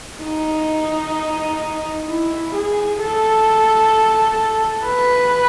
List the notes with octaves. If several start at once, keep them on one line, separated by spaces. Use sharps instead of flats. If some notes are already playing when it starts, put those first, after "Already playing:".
D#4
E4
G#4
A4
B4